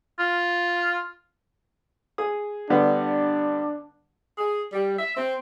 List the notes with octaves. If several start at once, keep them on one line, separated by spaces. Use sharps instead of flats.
F4
G#4 D#6
D3 G3 B3 D4
G#4
G3
E5
C4